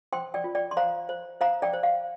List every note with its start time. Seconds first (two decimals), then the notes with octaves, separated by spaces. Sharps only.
0.12 C5 G5 C6
0.34 D5 G5
0.44 F4
0.55 D5 G5
0.71 C6
0.77 C5 F5 A#5
1.09 C5
1.41 C5 F5 A#5
1.62 D5 G5
1.73 C5
1.83 F5